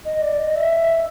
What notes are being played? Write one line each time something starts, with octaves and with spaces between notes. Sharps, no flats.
D#5
D5
D#5
E5